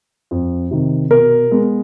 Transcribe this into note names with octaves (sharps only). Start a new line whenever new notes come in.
F2
C3 D#3
B2 A#4
G#3 B3